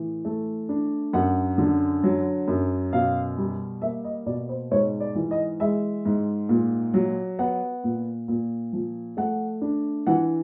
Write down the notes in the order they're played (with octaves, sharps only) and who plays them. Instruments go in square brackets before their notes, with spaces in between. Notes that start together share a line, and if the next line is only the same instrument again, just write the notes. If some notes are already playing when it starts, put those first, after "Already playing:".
Already playing: [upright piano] A2 E3
A3
D4
F#2 F#5
D3
F#3
F#2
B2 F5
G3
A#3 E5
D#5
B2 D5
C5
G#2 C#5
D5
E3
D#5
G#3 E5
G#2
A#2
F#3
B3 F#5
A#2
A#2
F3
A3 F#5
D4
E3 F#5